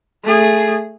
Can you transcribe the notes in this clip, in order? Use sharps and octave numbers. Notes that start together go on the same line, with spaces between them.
A3 G#4